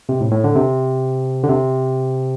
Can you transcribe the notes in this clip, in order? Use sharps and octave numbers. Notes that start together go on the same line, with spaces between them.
C3
A2
A2
D3
C3
D3
C3